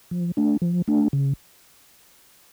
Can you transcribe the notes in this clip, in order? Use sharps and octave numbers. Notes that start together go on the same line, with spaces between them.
F3
A3 D4
F3
A3 D4
C#3